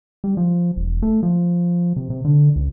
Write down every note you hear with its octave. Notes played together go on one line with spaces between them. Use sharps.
G3
F3
E1
A3
F3
C3
C3
D3
C#2